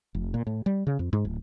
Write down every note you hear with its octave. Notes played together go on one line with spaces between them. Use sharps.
F1
A#2
A2
G3
C#3
F2
G#2
D1